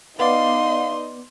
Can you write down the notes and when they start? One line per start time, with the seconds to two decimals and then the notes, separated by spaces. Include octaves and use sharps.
0.19 B3 D#4 D5 D#5 F5 C6